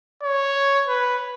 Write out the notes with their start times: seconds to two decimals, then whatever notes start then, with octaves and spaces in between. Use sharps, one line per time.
0.23 C#5
0.88 B4